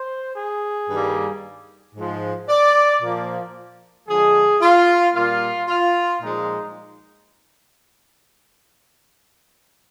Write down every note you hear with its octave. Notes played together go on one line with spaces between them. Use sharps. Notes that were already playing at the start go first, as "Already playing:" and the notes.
Already playing: C5
G#4
G2 D#3 G3 A#3
G#2 F3 G#3
D5
A#2 F3 A#3
D3 F3 G#3 G#4
F4
A#2 G3 A#3 F4
F4
A#2 F3 G#3 D#4